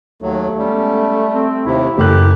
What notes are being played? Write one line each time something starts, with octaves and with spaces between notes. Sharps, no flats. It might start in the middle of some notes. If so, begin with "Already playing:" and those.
D#2 F#3 A3
G3 G#3 B3 C#4
C4
D#2 C3 E4
F#1 G4 A4 F#6